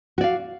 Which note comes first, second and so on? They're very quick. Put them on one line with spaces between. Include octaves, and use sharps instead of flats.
F#4 D5 F5